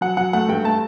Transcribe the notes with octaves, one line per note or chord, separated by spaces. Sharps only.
F#3 F#5
F#3 F#5
A3 F#5
G2 G5
A3 A5